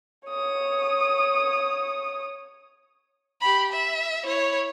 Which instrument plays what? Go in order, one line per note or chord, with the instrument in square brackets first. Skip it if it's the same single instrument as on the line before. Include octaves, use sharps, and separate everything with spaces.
[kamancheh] C#5 D#6
[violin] G4 B5
E5
E4 C#5